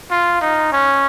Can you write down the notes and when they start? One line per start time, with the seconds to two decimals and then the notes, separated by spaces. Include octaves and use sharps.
0.11 F4
0.41 D#4
0.72 C#4